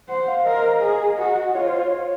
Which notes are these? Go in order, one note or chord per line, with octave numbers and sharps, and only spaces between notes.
C5 F#5
F5
A#4 D#5
G#4
F#4
F4 C#5
C5
C#5